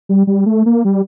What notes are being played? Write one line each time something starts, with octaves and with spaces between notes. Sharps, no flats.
G3
G3
A3
A#3
G3